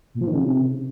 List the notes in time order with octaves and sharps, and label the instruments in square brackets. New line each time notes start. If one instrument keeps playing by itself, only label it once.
[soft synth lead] A#2
F3
D#3
C#3
C3